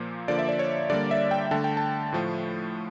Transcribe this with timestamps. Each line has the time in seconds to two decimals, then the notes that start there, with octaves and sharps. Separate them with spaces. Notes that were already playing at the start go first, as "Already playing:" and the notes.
Already playing: A#2 F3 A#3
0.28 D3 F3 A#3 D5
0.39 E5
0.49 D5
0.59 C#5
0.90 D3 G3 A#3 D5
1.11 E5
1.31 G5
1.51 D3 A3 A5
1.64 G5
1.77 A5
2.12 A2 F3 A3